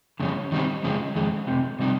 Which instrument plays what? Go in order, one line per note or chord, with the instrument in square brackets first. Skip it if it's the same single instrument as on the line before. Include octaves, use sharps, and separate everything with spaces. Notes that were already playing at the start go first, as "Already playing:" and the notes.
[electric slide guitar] F2 C#3 G3 C#4
D#3 G3 C4 D#4
F2 C#3 F3 G#3
F2 D#3 G#3
F2 C3 F3
C3 G3 C4 D#4